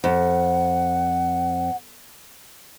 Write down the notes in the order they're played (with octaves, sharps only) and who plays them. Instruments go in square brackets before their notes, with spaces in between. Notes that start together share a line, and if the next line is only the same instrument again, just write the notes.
[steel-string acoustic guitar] F2 [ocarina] F#5